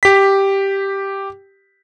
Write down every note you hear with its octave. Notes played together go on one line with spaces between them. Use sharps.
G4 B6